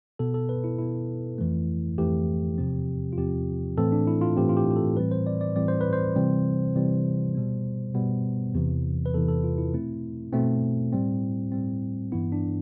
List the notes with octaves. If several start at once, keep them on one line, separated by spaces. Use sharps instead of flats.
B2 B3 A4
A4
B4
E4
B2 B3 E4
F2 E3 A3
F2 E3 A3 G4
E2 C3 F3 C4
F4
E2 C3 F3 C4 G4
A2 E3 A3 C4 A4
D4
E4
F4
A2 E3 A3 C4 G4
F4
G4
G4
A4
A2 E3 G3 C4 B4
C5
D5
D5
A2 E3 G3 C4 D5
C5
B4
C5
C3 E3 G3 C4
C3 E3 G3 C4
B2 G3 B3
B2 G3 B3
E2 C3 E3
B4
E2 C3 E3 A4
A4
F4
E4
B2 A3 C4 E4
B2 A3 C4
A2 G3 C4
A2 G3 C4
G2 E3 B3 E4
D4